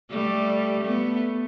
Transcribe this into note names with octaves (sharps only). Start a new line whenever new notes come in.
G3 A3
A3 B3